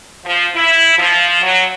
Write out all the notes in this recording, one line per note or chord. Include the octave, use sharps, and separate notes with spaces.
F3
E4
F3
F#3